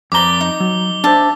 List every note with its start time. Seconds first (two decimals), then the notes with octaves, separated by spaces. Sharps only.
0.12 F2 B4 C5 D5 A#5 D6 G7
0.41 D#4
0.60 F#3
1.04 D4 C5 E5 A5